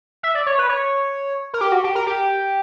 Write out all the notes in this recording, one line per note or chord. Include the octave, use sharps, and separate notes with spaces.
E5
D5
C#5
B4
C#5
A#4
G4
F#4
G4
A#4
G4